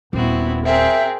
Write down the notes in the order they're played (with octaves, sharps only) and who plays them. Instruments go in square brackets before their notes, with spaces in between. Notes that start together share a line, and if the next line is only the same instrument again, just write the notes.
[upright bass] D#1 [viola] B3 E4 [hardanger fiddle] C4 F#4
[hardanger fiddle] C4 G#4 [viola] A#4 G5 [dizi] E5